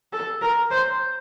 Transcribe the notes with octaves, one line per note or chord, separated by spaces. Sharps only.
A4
A#4
C5